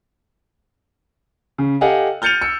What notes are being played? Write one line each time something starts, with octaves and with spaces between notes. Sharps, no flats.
C#3
G4 A4 D#5 F5 F#5 G#5
F6 G6 A6 C#7 D#7 F7
E6 C#7